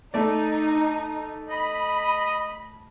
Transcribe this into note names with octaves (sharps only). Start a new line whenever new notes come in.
A3 D#4 D5
D#5 B5